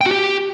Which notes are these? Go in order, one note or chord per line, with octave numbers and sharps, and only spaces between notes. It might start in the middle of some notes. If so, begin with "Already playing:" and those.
G5
F#4
G4